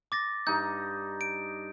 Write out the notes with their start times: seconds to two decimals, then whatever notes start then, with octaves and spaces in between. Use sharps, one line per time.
0.12 D6 A6 A#6
0.47 G2 D#4 G6
1.21 D7